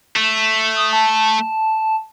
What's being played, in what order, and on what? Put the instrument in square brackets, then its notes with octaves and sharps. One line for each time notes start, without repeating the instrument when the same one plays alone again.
[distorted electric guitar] A3
[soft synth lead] D#6
A5